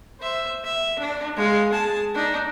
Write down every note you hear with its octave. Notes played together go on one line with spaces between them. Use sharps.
C5 E5
E5
D4
G#3 F5
G#4 A5
D4 D#4